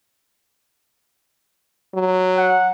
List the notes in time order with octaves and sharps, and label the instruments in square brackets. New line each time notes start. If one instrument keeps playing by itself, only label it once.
[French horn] F#3
[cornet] F#5